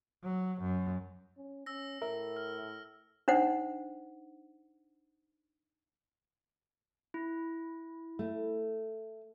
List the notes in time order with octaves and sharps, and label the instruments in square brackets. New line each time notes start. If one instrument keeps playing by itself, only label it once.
[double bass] F#3
F#2
[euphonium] C#4
[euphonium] C#4 [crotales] E6 A#6
[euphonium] A2 [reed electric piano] A#4 E5
[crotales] F6
[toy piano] D4 D#4 C5 F#5
[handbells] E4
[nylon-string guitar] A3